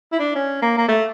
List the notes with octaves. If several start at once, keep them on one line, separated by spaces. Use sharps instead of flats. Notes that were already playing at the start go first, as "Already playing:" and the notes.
E4
D4
C#4
A#3
A#3
A3